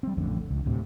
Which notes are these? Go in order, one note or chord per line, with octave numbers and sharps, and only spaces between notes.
G3 C4
A1 F2 A2 D3
C#2
D2 A2 C3